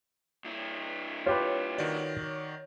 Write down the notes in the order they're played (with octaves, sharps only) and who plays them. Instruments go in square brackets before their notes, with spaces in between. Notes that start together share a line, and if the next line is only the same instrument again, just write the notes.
[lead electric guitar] G2 E4
[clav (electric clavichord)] F4 G4 B4 [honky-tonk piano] C#5
[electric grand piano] D#3 F#4 D5